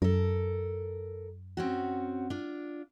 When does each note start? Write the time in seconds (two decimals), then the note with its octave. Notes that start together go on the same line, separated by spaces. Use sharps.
0.02 F#2 A4 A#4
1.57 C4 C#4 F#4
2.30 D4 F4